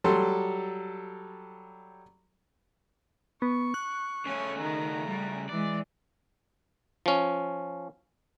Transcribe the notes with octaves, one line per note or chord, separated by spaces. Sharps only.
F#3 G3 A4 C6
B3 C#6
F#6
C#3 A3 C#4
D#3 A#5
G3
E3 G#3 D5
F3 C#4